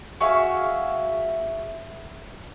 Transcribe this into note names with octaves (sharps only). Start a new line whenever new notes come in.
F#4 G#4 E5 F5